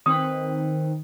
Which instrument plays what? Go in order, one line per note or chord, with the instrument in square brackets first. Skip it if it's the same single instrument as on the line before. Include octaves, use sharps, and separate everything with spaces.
[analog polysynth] D#3 [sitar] C4 B4 [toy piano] D#6